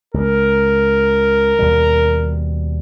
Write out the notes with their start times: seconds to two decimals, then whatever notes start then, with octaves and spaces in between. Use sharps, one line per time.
0.14 C#2 A#4
1.59 D#2 B2 G3